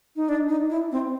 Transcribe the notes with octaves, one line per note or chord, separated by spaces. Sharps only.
D#4
D4
D#4
E4
C4